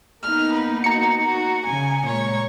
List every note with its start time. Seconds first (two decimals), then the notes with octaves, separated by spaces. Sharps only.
0.23 A#3 B3 D#4 F6
0.53 B4
0.84 F#4 A#5 C#7
1.22 F#4
1.66 C#3 G#5
2.06 A#2 G#3 C#5